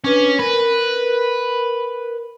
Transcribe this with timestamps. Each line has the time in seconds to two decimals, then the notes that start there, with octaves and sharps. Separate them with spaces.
0.04 C#4 D4 B4
0.39 A#4 B4